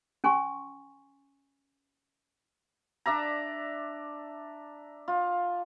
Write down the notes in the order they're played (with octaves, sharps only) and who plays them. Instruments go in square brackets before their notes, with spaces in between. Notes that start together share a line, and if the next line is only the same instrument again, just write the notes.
[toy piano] C#4 G#5 C6 C#6
[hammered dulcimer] D4 D5 E5 A#5
F4